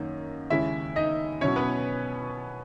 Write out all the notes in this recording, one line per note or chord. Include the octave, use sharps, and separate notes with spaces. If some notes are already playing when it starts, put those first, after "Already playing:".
Already playing: F#2 D#3 A#3 D#4
D#2 C#3 G#3 C#4 E4 E5
D#4 D#5
B2 F#3 C#4 E4 C#5
B3 B4